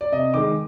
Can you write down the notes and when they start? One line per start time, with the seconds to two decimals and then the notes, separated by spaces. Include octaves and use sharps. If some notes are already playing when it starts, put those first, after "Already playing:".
0.01 D5
0.12 C3 D#5
0.34 D#3 G#3 D6